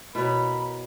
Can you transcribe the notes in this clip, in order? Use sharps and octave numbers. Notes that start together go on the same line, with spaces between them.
B2 E4 A#4 C#5 B5